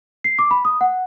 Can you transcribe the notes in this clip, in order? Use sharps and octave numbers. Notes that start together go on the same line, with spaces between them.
C7
D6
B5
D#6
F#5